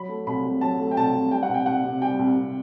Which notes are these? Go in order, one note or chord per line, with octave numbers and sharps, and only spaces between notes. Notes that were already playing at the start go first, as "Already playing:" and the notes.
Already playing: F#3 B5
A3
C2 B5
C3
F#3 A5
A3
G5
C2 A5
C3
G3 G5
F#5
C2
G5
C2 F#5
C3
G3 G5
C2
C2